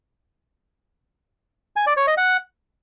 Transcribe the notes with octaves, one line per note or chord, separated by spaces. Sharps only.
G#5
D5
C#5
D#5
F#5